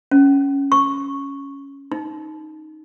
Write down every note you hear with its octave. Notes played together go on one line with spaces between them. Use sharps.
C#4
C#6
D#4